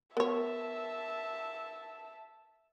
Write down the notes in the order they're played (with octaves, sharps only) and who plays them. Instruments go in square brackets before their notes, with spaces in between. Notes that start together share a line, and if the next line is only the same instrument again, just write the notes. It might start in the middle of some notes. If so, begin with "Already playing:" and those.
[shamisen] B3 C#5 [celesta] A#4 [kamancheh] E5 A5